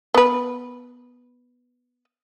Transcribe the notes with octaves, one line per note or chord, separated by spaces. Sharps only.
B3 B4